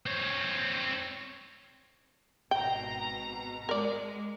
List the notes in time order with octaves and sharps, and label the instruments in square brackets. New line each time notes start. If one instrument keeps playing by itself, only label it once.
[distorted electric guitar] C4 C#5
[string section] G#1 B2 A#5 [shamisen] G5
[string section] G#3 [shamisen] A#4 D5